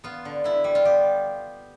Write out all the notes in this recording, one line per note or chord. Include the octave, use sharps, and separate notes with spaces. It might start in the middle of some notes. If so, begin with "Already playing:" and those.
B3 F4
D3
D3 E4
G3
F4
B3 G4